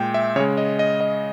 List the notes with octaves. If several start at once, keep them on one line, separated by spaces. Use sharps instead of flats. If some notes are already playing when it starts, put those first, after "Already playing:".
Already playing: A#2 G#3 G5
E5
C#3 G#3 C#5
D#5
D#5
D#5